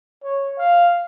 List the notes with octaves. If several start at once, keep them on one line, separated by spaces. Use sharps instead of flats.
C#5
F5